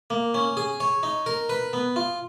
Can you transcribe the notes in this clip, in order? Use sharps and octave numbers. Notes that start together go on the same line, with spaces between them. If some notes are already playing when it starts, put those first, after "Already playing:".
A#3
C#4
G#4
C#5
D#4
A#4
B4
B3
F4